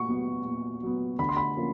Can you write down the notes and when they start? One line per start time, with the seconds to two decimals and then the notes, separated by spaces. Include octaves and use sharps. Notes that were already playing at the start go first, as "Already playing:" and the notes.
Already playing: A#2 C#6
0.09 F#3 B3
0.45 A#2
0.83 F#3 B3
1.19 D3 B5
1.29 C6
1.37 B5
1.57 F3 A#3 C#4